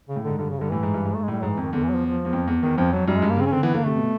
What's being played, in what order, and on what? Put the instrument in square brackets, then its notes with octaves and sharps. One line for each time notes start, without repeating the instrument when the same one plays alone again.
[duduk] C#3
[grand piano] A2
[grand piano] G#2 [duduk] D3
[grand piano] G2 [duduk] D3
[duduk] C#3
[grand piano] G2 [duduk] D3
[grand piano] A2 [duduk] E3
[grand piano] G#2
G2
G#2
[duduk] A3
G#3
[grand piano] A2 [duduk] G3
[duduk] F#3
[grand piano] G#2
[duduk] E3
[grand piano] F2 [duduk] D#3
[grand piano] E2 [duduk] D3
[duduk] E3
F#3
F3
F3
[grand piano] E2
F2
E2
[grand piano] E2 [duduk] D#3
[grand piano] F2 [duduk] F3
[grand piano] F2 [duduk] F#3
[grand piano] F#2 [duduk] G3
[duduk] G#3
[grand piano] G2
[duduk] A#3
[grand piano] C#3 [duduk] C4
[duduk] C#4
[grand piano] D3 [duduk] C4
[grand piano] E3 [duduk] B3
[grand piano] D3 [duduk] A#3
[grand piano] C3 [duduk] A3
[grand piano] B2